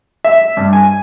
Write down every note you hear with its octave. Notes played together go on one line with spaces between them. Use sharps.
E5
G2
G#5